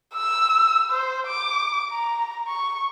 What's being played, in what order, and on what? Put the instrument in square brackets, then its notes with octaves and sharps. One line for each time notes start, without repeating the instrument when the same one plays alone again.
[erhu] E6
C5
D6
A#5
C#6